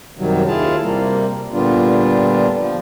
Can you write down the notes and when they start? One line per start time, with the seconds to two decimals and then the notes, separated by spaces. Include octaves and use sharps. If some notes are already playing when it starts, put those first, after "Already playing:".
0.17 F#2 C3 D#3 F#3 G3
0.47 D#2 E4 F4 G#4 F5 A5
0.81 C3 G3 A#3
1.52 A#2 D3 G3 B3 D4 F4
2.57 F3